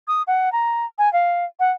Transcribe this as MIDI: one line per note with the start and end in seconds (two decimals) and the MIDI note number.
0.08 0.22 87
0.27 0.52 78
0.52 0.86 82
0.98 1.11 80
1.13 1.45 77
1.60 1.72 78